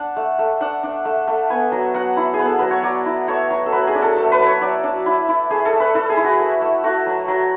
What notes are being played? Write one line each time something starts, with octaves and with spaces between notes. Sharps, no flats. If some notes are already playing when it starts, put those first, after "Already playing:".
Already playing: D4 F#5
A3
A3
D4 F#5
D4
A3
A3
B3 G#5
F#3
F#3 F#5
E4
G#4
B3
A4
F#3 B4
C#5
F#3 D5
E4
A3 C#5
F#3
A4
F#3 B4
G#4
D4
A4
A3 A4
B4
F#3
C#5
F#3 D5
D4
E4
E4
A3 G#4
A4
A3
B4
E4 A4
G#4
E4
F#4
A3
A3
A3 F#4
F#3
F#3